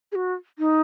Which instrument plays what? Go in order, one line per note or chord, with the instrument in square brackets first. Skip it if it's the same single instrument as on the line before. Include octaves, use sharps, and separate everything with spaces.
[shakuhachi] G#4
F#4
D#4